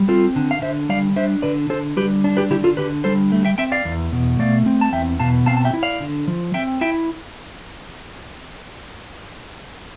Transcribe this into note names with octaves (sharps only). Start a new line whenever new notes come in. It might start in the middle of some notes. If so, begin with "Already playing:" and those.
Already playing: G3
C4 F4 A4
D3
F5
D3 C5 E5
G3 D5 F5
D4 C5 E5
D3 B4 D5
D3 A4 C5
G3 G4 B4
D4
G4 B4
D3 E4 G4
F4 A4
D3 G4 B4
G3 A4 C5
A3
E5 G5
C4 E5 G5
D5 F5
E2
B2
A3 D5 F5
C4
A5
E2 E5 G5
B2 F5 A5
C4 F5 A5
A5
E5 G5
E4
D5 F5
D3
F3
C4 E5 G5
E4 E5 G5